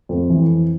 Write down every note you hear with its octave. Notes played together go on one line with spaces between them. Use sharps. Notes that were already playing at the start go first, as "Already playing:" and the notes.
F2
E3